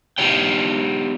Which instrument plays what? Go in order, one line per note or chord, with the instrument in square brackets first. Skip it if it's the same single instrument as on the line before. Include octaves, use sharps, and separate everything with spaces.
[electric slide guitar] B3 F4 G4 C#5 G5